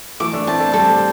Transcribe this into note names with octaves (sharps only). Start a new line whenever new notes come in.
E3 A3 D6
A3 D4
C4 E4 A5
A3 D4
G3 C4 A4